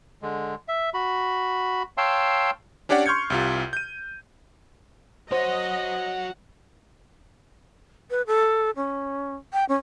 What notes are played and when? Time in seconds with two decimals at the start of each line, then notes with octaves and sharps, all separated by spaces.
0.22 D3 G#3
0.68 E5
0.94 F#4 B5
1.98 C#5 F5 G5 A5 C6 E6
2.89 C#4 D4 G4 C#5 D5 F#5
3.06 C6 C#6 F6 G6 G#6 C#7
3.30 C2 C3 F4
3.73 G6 D#7
5.32 F#4 C5 C#5 D#5 F#5
8.10 B4
8.27 A4
8.76 C#4
9.53 G5
9.69 C#4